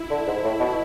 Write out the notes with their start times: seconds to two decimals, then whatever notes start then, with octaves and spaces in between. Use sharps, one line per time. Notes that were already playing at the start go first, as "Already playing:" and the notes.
Already playing: E4
0.10 D3
0.27 G#2
0.44 A2
0.60 B2